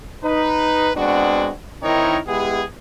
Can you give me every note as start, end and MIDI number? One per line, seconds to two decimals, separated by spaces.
0.24 0.91 63
0.24 0.91 71
0.97 1.51 56
0.97 1.51 59
0.97 1.51 60
0.97 1.51 62
0.97 1.51 66
1.83 2.18 51
1.83 2.18 60
1.83 2.18 63
1.83 2.18 64
1.83 2.18 70
1.83 2.18 73
2.27 2.63 56
2.27 2.63 59
2.27 2.63 64
2.27 2.63 67
2.27 2.63 68